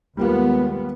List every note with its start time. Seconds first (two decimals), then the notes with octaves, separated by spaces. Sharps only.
0.17 D#2 G3 G#3 A#3 B3 F4